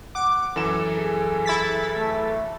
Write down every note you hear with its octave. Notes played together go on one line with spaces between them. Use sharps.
F#5 D6
F#2 E3 A4 E7
G#4
E4 A6 B6
A3